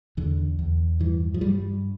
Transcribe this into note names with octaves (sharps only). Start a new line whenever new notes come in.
E2 D3
E2
G2 E3
F3
G2 G3